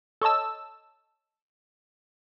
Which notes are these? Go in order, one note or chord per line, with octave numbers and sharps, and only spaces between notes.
A4 C#5 D#5 A5 E6